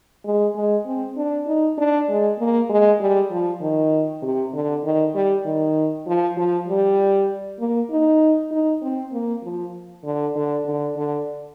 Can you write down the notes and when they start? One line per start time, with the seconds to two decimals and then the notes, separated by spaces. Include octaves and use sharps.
0.25 G#3
0.55 G#3
0.86 C4
1.17 D4
1.47 D#4
1.78 D4
2.09 G#3
2.39 A#3
2.69 G#3
3.00 G3
3.31 F3
3.61 D#3
4.22 C3
4.53 D3
4.84 D#3
5.14 G3
5.45 D#3
6.07 F3
6.37 F3
6.67 G3
7.59 A#3
7.90 D#4
8.51 D#4
8.82 C4
9.12 A#3
9.43 F3
10.04 D3
10.35 D3
10.66 D3
10.96 D3